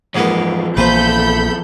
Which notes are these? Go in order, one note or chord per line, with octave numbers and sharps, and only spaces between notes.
E2 G#2 F3 A#3 B3
A#1 E3 A#3 A4 B4 C5 B5 G6